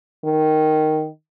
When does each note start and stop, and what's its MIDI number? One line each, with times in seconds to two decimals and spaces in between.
0.24 1.08 51